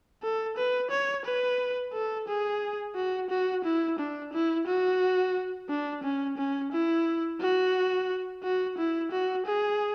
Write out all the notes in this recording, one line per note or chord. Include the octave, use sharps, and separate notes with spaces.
A4
B4
C#5
B4
A4
G#4
F#4
F#4
E4
D4
E4
F#4
D4
C#4
C#4
E4
F#4
F#4
E4
F#4
G#4